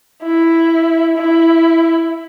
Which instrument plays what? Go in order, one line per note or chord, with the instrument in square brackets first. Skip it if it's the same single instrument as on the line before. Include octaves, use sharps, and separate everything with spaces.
[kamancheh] E4
E4